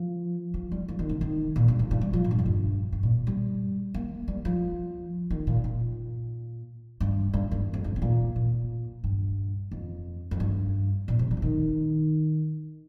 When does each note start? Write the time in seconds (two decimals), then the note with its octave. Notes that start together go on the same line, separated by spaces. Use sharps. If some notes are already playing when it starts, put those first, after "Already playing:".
Already playing: F3
0.54 F3
0.72 G3
0.88 F3
0.99 D#3
1.09 C3
1.21 D#3
1.56 A#2
1.68 G2
1.79 F2
1.91 G2
2.01 G3
2.13 F3
2.24 A#2
2.31 G2
2.39 F2
2.46 G2
2.92 G2
3.03 A#2
3.27 G3
3.94 A#3
4.28 G3
4.45 F3
5.30 D#3
5.47 A#2
5.64 A#2
7.00 G2
7.34 G2
7.51 G2
7.74 F2
7.84 G2
7.96 C3
8.02 A#2
8.36 A#2
9.04 G2
9.71 F2
10.31 F2
10.40 G2
11.08 A#2
11.19 C3
11.31 G3
11.37 F3
11.42 D#3